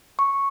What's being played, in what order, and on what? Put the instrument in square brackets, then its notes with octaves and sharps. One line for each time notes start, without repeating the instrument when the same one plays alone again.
[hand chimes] C#6